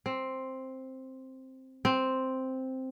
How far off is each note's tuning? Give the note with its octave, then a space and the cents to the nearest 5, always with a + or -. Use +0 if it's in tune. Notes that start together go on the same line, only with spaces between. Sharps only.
C4 +5
C4 +0